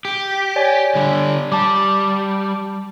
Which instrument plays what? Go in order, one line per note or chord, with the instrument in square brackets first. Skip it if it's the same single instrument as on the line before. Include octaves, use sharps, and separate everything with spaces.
[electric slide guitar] G4 [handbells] D7
[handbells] C#5 D5 G#5
[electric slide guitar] D3 G3
[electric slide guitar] G3 [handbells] A5 D6